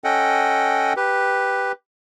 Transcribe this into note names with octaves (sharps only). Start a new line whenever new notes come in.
C#4 A4 D#5 F#5 G5
G4 B4